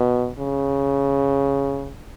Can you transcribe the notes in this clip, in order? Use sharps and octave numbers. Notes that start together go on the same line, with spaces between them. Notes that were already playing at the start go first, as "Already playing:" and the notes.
Already playing: B2
C#3